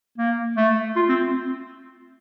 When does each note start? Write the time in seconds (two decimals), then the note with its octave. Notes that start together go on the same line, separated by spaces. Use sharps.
0.18 A#3
0.57 A3
0.96 F4
1.09 C4